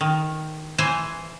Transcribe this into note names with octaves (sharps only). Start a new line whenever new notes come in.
D#3
E3 C5 G#5